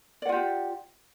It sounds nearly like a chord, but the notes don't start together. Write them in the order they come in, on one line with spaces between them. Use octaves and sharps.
D5 F#5 F4 G4